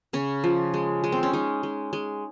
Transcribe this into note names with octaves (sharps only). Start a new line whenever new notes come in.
C#3 C#4
F3
G#3
G#3
C4
C#4
G#3 D#4
G#3
G#3